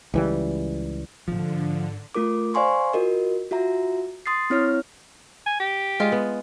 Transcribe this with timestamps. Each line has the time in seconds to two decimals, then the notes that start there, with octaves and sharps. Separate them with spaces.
0.14 C#2 E3 G3
1.28 G#2 D3 F3 D4
2.15 A3 F4 A#4 D6
2.54 C5 D5 F5 G#5 C6 C#6
2.93 F4 F#4 A#4 D#5
3.51 F4 F#4 E5 A#5
4.26 C6 D#6 A6 C7
4.50 C4 E4 C#5 F6
5.46 G#5
5.60 G4
6.00 G#3 F4
6.12 B3